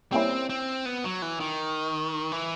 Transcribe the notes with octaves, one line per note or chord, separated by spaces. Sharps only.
G3 A#3 C4 C#4 E4
C4
B3
F#3
E3
D#3
E3